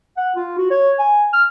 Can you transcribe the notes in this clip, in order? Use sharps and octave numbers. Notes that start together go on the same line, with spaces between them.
F#5
F4
F#4
C#5
G#5
F6